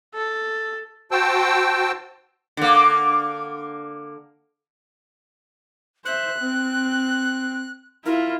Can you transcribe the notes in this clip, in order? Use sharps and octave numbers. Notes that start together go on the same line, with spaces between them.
A4
F#4 C5 G5 A5 E6
D3 A#3
C5 E5 F#6
C4
E4 F4 A#4